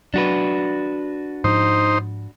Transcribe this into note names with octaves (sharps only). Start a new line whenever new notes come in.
F#3 D4 F#4 B4
G#2 F3 D#4 C5